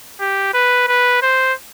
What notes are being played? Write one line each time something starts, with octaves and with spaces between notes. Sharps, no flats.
G4
B4
B4
C5